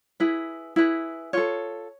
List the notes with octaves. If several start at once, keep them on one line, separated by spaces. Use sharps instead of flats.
E4 G#4 B4
E4 G#4 B4
F4 A4 C#5